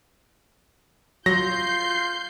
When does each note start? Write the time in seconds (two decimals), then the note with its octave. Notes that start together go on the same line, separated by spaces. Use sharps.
1.26 F#3 F4 G6 A#6 C7